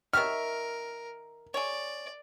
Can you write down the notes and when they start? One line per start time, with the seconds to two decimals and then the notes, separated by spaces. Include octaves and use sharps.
0.13 D#3 A#4 C#5 E5 F6
1.54 G#4 C#5 D5